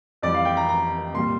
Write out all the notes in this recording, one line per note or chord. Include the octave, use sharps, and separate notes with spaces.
F2 E3 G3 D5
F5
G5
A#5
A#5
C2 A#2 G3 C6